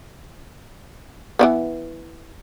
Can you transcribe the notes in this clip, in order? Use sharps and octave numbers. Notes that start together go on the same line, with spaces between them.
E3 F#3 B3